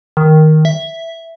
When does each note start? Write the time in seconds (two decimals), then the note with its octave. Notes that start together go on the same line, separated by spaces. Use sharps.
0.17 D#3
0.65 E5